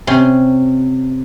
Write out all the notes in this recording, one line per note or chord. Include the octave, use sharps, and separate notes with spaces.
C3 C#4 C6